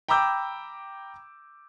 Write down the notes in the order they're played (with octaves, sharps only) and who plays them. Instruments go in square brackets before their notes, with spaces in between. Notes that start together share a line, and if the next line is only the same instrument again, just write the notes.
[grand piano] G5 A#5 B5 D6 E6 G6